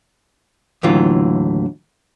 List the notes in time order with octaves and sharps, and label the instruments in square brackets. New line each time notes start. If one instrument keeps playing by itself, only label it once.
[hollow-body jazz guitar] D#2 A2 D3 E3 F#3 F4